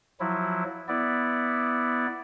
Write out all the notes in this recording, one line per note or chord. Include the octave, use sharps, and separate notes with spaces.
F3 F#3 E4
B3 E4 D5